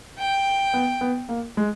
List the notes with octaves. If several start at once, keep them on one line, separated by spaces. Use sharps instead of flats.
G5
B3
B3
A#3
G#3